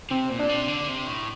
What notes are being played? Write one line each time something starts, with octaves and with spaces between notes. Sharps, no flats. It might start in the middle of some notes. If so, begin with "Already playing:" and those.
C3 C4
A#2
D4
C3
D3
C3
A2